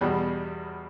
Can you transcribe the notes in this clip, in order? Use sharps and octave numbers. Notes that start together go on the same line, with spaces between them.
E2 B2 G3